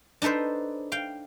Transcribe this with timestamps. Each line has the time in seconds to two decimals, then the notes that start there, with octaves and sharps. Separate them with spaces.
0.22 D4 D#4 A4 B4 C5
0.92 F5 G5